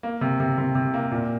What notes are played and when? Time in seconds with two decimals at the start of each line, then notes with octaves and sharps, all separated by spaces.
0.03 A#3
0.21 C3
0.40 C3
0.58 C3
0.75 C3
0.94 A#3
1.12 A#2